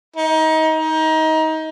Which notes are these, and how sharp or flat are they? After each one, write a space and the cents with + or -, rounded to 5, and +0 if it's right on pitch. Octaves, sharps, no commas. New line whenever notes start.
D#4 +25
D#4 +25